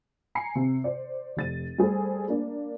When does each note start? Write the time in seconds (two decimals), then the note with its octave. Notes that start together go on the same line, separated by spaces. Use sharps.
0.35 G#5 A#5 C7 C#7
0.55 C3 C4
0.84 C5 D5
1.37 F1 A6 D#7
1.78 G3 A3 G#4 A4 C5
2.28 A#3 D4